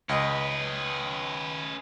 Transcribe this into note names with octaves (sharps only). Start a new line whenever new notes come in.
C#2 C#4 B4 D#5